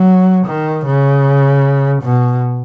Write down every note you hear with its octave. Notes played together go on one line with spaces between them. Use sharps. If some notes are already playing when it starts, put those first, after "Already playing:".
Already playing: F#3
D#3
C#3
B2